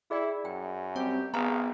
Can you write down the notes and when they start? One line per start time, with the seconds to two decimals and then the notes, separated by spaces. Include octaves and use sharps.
0.11 E4 G#4 D5 G5
0.45 F#2 G5
0.96 G3 C4 G4
1.34 G#1 B3 G#4 F5 F#5 A#5